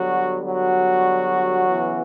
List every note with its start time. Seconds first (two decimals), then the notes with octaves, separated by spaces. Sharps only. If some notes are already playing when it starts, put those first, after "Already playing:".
Already playing: D3 F#3 G3 B3 F#4
0.46 F#3 F#4
1.66 C#3 E3 B3